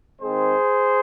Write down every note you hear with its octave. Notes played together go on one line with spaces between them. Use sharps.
D#3 G#3 C4 G#4 C5